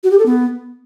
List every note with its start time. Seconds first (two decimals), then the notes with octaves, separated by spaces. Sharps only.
0.04 F#4
0.11 G4
0.18 A4
0.26 B3